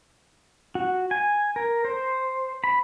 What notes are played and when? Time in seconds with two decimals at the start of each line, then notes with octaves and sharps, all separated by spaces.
0.75 F#4
1.11 G#5
1.56 A#4
1.85 C5
2.64 B5